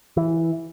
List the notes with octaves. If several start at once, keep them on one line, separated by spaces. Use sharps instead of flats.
E3